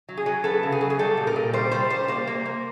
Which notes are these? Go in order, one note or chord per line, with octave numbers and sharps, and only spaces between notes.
F#3
G#4
F#3
B3 A4
C#3
G#4
F#3
G#4
G3 A4
A#2
A#4
A#2
G3 C5
G3 C5
G3 C5
A#3 C5
A#3
A#3